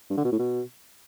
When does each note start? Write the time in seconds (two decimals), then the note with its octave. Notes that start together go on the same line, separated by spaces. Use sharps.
0.10 G2
0.17 D3
0.25 B2
0.32 A2
0.39 B2